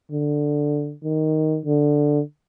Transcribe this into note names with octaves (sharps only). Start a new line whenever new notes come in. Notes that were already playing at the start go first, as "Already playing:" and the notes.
D3
D#3
D3